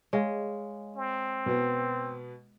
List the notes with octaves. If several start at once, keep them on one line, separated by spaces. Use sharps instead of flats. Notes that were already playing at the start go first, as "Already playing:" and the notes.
G#3 C#5 F5 G#5
C4
B2 B3